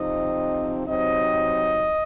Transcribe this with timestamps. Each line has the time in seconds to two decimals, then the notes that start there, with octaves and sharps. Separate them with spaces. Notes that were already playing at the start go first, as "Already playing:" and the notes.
Already playing: C3 F3 C4 D#4 D#5
0.87 C3 F#3 C4 D#4 D#5